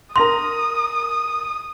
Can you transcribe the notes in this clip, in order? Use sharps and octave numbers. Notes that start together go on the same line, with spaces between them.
A#4 C6 D#6 A#6 F7